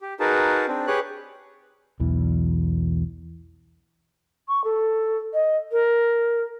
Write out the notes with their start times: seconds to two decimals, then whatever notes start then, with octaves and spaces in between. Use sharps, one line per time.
0.01 G4
0.20 D#4 F#4 G#4 A#4 B4 A5
0.68 C4 D4
0.87 G4 G#4 B4 C#5 F#6
2.00 B1 E2 E3
4.49 C#6
4.64 A4
5.34 D#5
5.72 A#4